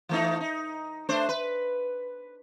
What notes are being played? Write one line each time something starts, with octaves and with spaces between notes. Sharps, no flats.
E3 A3 D#4
D#4
A3 D4 C5
B4